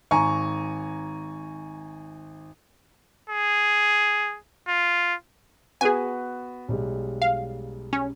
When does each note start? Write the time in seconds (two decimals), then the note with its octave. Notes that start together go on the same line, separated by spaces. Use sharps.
0.11 G#1 G#5 A#5 C#6
3.30 G#4
4.68 F4
5.81 B3 F#4 G#4 B4 G#5
6.69 B1 G3 G#3
7.22 F5
7.93 C#4